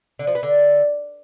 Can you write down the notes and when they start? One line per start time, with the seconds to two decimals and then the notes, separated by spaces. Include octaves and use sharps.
0.19 D3
0.27 F3
0.35 B3
0.43 D3